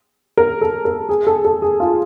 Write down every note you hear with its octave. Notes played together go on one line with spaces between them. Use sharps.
A#4
A4
A#4
G#4
A4
A4
G#4
F4